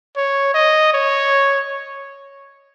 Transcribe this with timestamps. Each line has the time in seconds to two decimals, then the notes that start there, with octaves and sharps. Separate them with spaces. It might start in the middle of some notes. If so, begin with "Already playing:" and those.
0.17 C#5
0.55 D#5
0.93 C#5